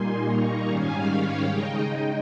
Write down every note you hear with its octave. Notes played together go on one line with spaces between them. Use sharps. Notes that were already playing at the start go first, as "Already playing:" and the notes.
Already playing: A#2 G3 A#3 D#4 G#5 C6
A#5 C#6
G#2 D#3 G3 C#4 F5 G#5
C#5 F5
C#3 G#3 D#4 D#5 G5
D#5 G5